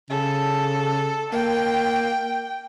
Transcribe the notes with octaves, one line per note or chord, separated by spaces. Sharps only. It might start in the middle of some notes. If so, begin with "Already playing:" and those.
C#3 A4
A#3 G5